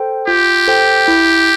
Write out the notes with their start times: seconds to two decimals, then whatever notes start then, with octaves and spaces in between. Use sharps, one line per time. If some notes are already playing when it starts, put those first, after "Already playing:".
Already playing: A4 C5 G5
0.28 F4 G4
0.68 A4 C5 G5
1.08 E4